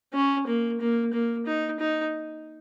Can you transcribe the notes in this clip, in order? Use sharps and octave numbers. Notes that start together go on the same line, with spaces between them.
C#4
A#3
A#3
A#3
D#4
D#4